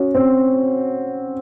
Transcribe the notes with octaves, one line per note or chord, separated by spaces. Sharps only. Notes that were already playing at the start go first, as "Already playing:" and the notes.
Already playing: C#4 F#4
C4